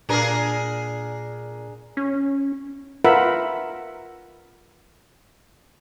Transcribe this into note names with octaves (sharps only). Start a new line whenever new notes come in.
A#2 D4 G#4 A#4
C#4
F4 A#4 B4 E5 F#5 B5